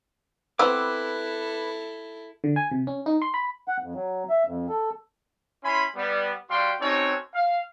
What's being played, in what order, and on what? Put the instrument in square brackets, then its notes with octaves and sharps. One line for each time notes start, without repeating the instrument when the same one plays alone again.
[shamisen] B3 C4 [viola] E4 A4 [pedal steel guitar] B4 D6 [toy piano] E6
[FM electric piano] D3
G#5
C3
C#4
D#4
C6
B5
[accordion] F#5
F2
F#3
E5
F2
A4
[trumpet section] C#4 E4 G#5 B5 C6
G3 B3
G3 F#4 F5 G5 C6
C4 C#4 D#4 F#4 A4 C#5
F5